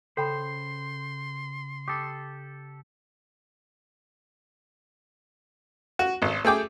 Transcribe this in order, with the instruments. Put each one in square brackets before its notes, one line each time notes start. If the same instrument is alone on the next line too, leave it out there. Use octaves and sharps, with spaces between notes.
[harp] C#3 [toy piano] A4 G5 B5 [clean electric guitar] C5 [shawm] C6
[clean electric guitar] G4 A4 [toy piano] D6 D#6
[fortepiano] F#4
G#1
A3 G#4 G5 D6